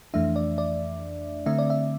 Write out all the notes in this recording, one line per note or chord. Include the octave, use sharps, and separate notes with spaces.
F2 E3 A3 D4 E5
D5
D5
D3 A3 C4 E5
D5
E5